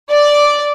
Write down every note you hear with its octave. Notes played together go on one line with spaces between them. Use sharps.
D5